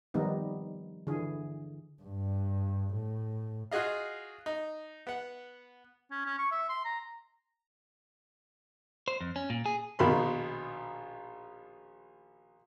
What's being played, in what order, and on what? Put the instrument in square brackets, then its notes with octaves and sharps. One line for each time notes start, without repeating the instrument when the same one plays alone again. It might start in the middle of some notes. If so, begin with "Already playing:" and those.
[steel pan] D#3 F3 G3 B3 D#4
D3 E3 G#4
[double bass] G2
A2
[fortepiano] F4 F#4 G#4 D#5 F5
D#4
B3 F#5
[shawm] C#4
C#4
C#6
E5
C6
A#5
[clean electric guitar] C5
F2
C#4
A#2
G#4
[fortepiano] A#1 B2 D#3 B5 C6